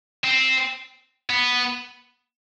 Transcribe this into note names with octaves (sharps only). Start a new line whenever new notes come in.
C4
B3